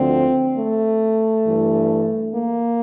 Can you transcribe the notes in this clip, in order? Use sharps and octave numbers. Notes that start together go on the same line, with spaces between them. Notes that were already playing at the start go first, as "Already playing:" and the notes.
Already playing: D2 D3 F3 C4
A3
G2 E3
A#3